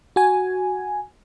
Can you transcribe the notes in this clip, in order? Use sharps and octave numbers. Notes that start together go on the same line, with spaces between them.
F#4 G#5